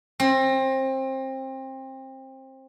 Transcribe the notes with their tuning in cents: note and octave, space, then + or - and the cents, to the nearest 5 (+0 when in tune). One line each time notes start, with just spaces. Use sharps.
C4 +25